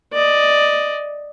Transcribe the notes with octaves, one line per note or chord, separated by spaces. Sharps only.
D5 D#5